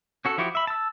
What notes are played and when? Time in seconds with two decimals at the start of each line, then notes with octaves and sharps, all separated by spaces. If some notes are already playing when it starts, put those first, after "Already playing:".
0.25 C#4 F#4 A4
0.38 F3 E4 F#4 G4
0.55 E5 B5
0.67 A5 E6